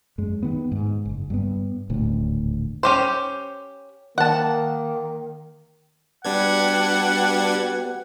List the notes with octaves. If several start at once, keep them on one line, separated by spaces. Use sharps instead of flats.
F#2 G#3
D#3 B3
G#2
F#1
G2 A3 B3
D#1 D2 A2
C#4 G4 C5
D#3 A#3 F#5 A5
G3 B3 D4 F#4 G4 F#5 G#6